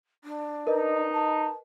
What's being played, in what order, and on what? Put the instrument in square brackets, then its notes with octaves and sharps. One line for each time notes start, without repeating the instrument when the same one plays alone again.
[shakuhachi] D4
[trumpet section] D#4 [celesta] A#4 B4 D#5
[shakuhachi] A5